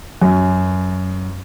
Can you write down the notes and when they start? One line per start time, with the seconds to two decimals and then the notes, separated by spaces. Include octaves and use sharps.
0.22 F#2